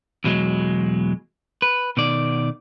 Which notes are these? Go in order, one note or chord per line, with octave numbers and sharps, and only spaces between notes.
E2 B2 F#3 G#3
B4
B2 D#3 D5